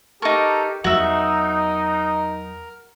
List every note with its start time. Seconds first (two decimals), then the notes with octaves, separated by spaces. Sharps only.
0.22 D#4 G4 A4 A#4 C#6
0.84 E2 F#3 D#4 F#4 A#4 E5